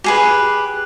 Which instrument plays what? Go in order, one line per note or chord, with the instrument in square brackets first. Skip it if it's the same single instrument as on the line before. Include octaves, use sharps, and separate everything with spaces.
[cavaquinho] G4 G#4 B4